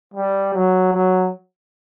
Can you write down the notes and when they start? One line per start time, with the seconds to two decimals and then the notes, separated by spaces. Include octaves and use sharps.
0.14 G3
0.54 F#3
0.93 F#3